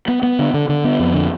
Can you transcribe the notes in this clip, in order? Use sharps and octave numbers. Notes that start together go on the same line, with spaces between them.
B3
B3
D3
D3
D3
B3
F2
D3